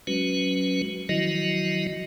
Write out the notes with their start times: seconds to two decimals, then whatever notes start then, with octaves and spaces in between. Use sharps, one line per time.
0.07 F#3 G#3 C#4 F#4 B4
1.09 D#3 F3 F#3 E4 F#4 D#5